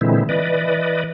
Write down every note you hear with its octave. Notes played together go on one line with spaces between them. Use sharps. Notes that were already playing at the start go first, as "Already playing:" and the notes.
A#2 D3 E3 G#3 C4 E4
E3 B4 D5 D#5